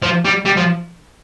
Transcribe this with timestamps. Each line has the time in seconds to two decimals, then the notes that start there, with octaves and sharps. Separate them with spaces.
0.03 F3
0.25 G3
0.46 G3
0.57 F3